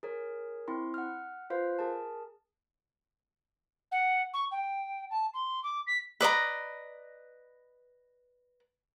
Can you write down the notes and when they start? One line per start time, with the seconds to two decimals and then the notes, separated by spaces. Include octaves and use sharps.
0.03 G#4 A#4 C#5
0.68 C4 E4 C6
0.94 F#5 F6
1.50 F4 B4 C5 F5
1.79 G#4 A#4 A5
3.91 F#5
4.33 C#6
4.51 G5
5.10 A5
5.34 C6
5.63 D6
5.87 B6
6.21 B4 D5 D#5 A#5